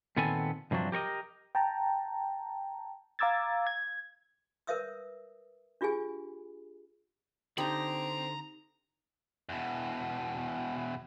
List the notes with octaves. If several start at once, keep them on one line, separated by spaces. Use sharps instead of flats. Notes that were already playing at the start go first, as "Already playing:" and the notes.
A#2 D#3 B3 C4 A4 G#5
G2 C3 F3 F#3 D4
G4 A#4 C#5 D#5
G5 A5 A#5
F5 A#5 D6 E6 G#6 A6
G#6
A#4 B4 C#5 E5 D#6 E6
D4 F4 G4 G#4 G#5
D3 C4 D#4 G4 A#5 B5
E2 B2